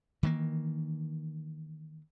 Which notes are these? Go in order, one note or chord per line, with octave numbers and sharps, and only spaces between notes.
D#3 E3 G#3 A#3